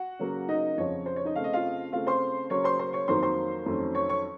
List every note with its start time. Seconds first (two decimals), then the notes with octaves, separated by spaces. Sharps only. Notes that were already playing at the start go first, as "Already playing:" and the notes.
Already playing: F#4 F#5
0.19 C#3 F#3 A#3
0.48 D#4 D#5
0.77 F2 C#3 F3 C#5
1.06 C5
1.16 C#5
1.25 D#4 D#5
1.36 C#3 A3 C4 F5
1.44 D#5
1.53 F4 F5
1.92 C#3 A3 C4 F4 F5
2.07 C5 C6
2.50 C#3 F#3 A#3 C#4 C#5 C#6
2.64 C5 C6
2.79 C5 C6
2.93 C#5 C#6
3.08 F2 D#3 F#3 A#3 C5 C6
3.22 C5 C6
3.66 F2 D#3 F#3 A3 C#4
3.95 C#5 C#6
4.09 C#5 C#6